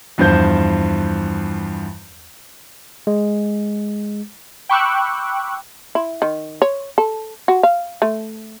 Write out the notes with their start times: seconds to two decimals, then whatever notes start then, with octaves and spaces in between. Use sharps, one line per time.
0.18 E2 G2 F3 C5 G6
3.07 G#3
4.69 G5 B5 C#6 D6 E6 F#6
5.95 E4
6.22 D#3
6.62 C#5
6.98 A4
7.48 F#4
7.63 F5
8.02 A3